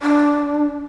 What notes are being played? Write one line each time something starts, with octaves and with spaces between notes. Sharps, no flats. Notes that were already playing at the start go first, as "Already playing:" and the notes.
D4